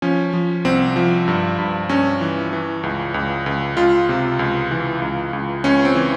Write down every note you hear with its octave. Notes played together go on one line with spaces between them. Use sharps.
F3 C#4
F3
C2 C4
F3
G2
G2
G2 C#4
E3
E3
C#2
C#2
C#2
C#2 F4
C3
C#2
E3
C#2
C#2
C#2 C#4
C4
E3